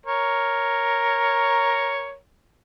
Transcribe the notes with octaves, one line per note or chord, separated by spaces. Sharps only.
A#4 C#5